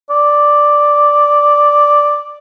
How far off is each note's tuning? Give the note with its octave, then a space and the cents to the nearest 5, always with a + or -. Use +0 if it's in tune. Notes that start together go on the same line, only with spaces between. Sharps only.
D5 +0